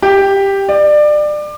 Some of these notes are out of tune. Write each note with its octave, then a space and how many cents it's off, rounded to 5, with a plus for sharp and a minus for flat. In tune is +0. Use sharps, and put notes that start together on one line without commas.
G4 +5
D5 +25